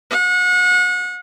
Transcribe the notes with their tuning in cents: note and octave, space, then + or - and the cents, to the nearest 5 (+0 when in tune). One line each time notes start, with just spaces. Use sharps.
F#5 -35